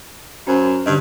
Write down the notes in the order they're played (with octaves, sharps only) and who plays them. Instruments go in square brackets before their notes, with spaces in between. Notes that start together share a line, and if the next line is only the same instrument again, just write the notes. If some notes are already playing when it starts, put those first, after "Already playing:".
[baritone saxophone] F#2 [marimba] C#4 C5
[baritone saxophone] G2 [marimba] D3 D#5